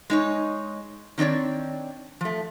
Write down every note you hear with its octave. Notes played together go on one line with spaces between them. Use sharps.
G#3 D#4 C#5
D#3 C4 D4 C#5 D5
F3 A3